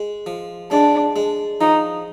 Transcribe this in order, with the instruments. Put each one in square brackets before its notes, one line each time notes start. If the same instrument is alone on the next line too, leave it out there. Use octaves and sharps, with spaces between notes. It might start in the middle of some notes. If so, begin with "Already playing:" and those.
Already playing: [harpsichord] G#3
F3
[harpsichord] G#3 [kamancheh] D4
[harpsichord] G#3
[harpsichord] F3 [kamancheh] D#4